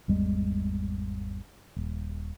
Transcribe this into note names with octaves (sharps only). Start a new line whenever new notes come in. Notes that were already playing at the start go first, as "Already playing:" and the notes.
G#1 E2 G3 G#3
D#1